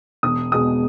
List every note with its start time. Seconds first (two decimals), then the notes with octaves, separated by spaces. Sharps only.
0.23 E1 D#6
0.52 E2 B2 G#3 D#6